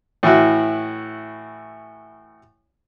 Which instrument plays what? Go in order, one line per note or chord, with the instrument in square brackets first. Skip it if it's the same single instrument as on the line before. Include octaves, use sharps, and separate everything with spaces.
[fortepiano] A2 E3 E4 F#4